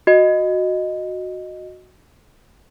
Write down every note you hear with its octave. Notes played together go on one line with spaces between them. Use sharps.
F#4 D#5